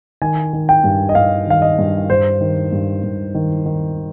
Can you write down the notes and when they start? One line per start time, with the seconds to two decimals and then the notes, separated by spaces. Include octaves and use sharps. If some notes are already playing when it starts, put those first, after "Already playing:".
0.22 D#3 G#5
0.53 D#3
0.69 G5
0.84 G2
1.09 D#5
1.15 G2 F5
1.47 D#3 F5
1.62 D#5
1.78 G2
2.10 G2 C5
2.41 D#3
2.72 G2
3.03 G2
3.35 D#3
3.66 D#3